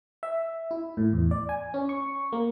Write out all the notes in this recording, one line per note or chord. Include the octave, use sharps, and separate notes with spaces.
E5
E4
A2
E2
D5
G#5
C#4
C#6
A#3